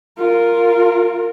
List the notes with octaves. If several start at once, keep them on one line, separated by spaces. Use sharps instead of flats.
F4 A#4